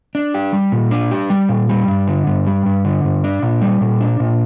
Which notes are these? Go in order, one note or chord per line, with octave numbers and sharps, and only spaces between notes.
D4
G4
G3
A#2
D4
G4
G3
A#2
G3
G2
D3
G2
G3
G2
D3
G2
D4
A#2
G3
A#2
D4
A#2